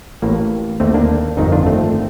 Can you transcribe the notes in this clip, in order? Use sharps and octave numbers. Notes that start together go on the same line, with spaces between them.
A1 A2 A#3
D#2 D3 A3 C4
A#3 D4
G1 F2 D#3 C4 D#4
D4 F4
A3 C4